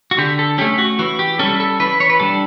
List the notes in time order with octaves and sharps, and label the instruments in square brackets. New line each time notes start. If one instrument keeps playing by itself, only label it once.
[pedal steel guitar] F#4
D3 G4
A4
A3 C#4 G4
F#4
E3 F#4
G4
G3 C#4 A4
A4
E3 B4
C#5
B4
G3 D4 A4